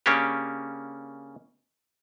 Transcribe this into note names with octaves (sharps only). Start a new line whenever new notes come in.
C#3 A#3 C#4 D4 G4